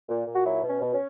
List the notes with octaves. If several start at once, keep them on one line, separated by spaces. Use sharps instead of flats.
A#2
A#2
F#4
F#3 E4
B2
C#4
B2
C#4